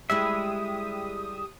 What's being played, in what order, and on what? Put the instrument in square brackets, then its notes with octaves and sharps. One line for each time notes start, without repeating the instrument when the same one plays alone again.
[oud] G3 G#3 E4 [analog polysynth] G4 D#6 [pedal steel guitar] E5